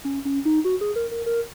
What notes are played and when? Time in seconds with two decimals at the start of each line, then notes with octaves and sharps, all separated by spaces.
0.05 C#4
0.25 C#4
0.45 D#4
0.65 F#4
0.81 G#4
0.96 A#4
1.11 A#4
1.26 A#4